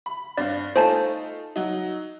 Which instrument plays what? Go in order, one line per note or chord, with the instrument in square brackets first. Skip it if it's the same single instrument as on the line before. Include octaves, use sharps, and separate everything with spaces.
[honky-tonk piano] B5
[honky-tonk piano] G2 C4 F5 [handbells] D5
[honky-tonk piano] A3 D#4 F4 [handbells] C5 G#5 A5
[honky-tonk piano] F#3 D#4